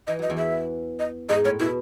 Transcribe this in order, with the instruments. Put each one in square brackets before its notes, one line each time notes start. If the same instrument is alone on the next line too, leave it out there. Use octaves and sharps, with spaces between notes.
[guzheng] E3 [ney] D#5
[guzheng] F#3 [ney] D#5
[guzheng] E2 E3
[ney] E5
D#5
[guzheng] G#2 G#3 [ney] D#5
[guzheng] A2 [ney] C#5
[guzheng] B2 [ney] E4